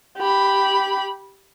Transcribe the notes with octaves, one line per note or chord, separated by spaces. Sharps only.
G4 B5